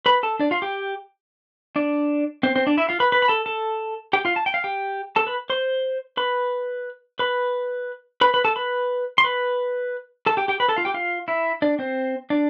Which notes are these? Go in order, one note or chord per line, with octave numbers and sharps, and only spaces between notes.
B4 B5
A4 A5
D4 D5
F4 F5
G4 G5
D4 D5
C4 C5
C4 C5
D4 D5
E4 E5
F4 F5
B4 B5
B4 B5
B5
A4 A5
A4 A5
G4 G5
F4 F5
A5
G5
F5
G4 G5
A4 A5
B4 B5
C5 C6
B4 B5
B4 B5
B4 B5
B4 B5
A4 A5
B4 B5
C6
B4 B5
A4 A5
G4 G5
G4 G5
B4 B5
A4 A5
F4 F5
G4 G5
F4 F5
E4 E5
D4 D5
C4 C5
D4 D5